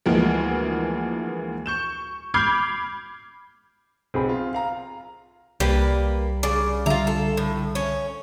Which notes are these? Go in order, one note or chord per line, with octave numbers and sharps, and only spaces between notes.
D2 E3 F3 G#3 A#3
C#6 G6 E7
B5 D6 F6 G6 G#6 C7
B1 C4 G#4 B5
F4
F5 A#5
C2 G3 A#3 B4
C#3 D5
D3 G3 F4 E5 A#5
A4
A2
C#4